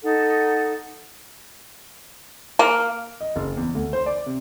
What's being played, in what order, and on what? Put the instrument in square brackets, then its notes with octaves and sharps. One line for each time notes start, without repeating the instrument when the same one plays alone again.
[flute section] D#4 A4 F#5
[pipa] A#3
[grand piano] D#5
F#1
E2
D2
C5
D5
C3